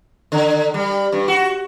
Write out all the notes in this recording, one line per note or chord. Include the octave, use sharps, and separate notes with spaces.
D3
G3
G2
F#4